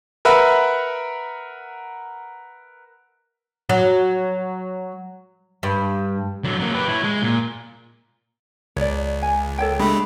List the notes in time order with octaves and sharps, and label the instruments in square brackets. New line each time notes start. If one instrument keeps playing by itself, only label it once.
[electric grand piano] A#4 B4 E5 F#5 B5
[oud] F#3
G2
[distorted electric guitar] D3 F#3
F#3 A#3
G4 B4
E4 C#5
G#3
A#2
[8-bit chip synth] C#2 [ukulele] C#5 D5
[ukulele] G#5
A4 C#5 G5
[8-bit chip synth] G#3 A3 [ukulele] D4 G4 B5